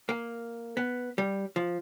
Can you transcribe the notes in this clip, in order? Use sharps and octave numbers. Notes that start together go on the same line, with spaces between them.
A#3
B3
G3
F3